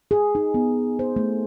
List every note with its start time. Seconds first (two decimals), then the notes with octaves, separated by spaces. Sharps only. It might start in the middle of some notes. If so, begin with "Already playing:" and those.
0.11 G#4
0.35 D#4
0.54 B3
0.99 C5
1.16 A3